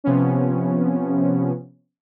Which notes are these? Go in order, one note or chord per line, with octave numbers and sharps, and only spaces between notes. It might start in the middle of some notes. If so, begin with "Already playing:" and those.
C3 F3 B3 C#4